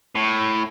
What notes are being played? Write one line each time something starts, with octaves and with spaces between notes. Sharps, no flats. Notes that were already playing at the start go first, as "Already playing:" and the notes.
A2